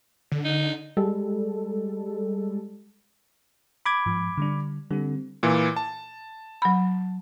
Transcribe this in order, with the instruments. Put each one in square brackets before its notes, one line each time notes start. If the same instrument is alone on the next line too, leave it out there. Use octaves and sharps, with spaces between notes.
[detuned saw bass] D3
[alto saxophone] D#4
[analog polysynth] G3 G#3 A4
[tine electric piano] B5 D6 G#6
[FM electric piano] G#2 F3
D3 G3 D4
[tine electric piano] D3 [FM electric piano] G3 C4
[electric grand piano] A#2 E3
A5
[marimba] F#3 B5